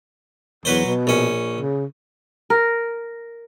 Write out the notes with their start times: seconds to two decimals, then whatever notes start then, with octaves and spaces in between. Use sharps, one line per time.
0.65 E2 F#3 B4 C5
0.85 B2
1.07 A#1 C#4
1.58 C#3
2.50 A#4